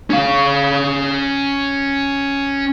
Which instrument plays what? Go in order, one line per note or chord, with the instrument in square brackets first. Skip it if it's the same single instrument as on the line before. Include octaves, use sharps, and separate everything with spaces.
[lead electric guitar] C#4 F5